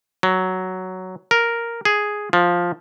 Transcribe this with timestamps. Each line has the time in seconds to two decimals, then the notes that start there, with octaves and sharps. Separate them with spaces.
0.23 F#3
1.31 A#4
1.85 G#4
2.33 F3